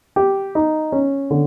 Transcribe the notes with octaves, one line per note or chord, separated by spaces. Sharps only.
G4
D#4
C#4
D3